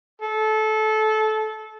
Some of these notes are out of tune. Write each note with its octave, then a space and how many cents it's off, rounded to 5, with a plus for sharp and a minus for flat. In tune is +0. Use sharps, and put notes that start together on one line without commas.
A4 -20